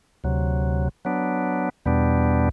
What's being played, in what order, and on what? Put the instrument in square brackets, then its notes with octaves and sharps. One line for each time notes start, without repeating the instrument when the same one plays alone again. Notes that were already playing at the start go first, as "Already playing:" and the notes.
[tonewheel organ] D2 C3 F#3
F#3 B3 D4
E2 B2 G3 B3 D4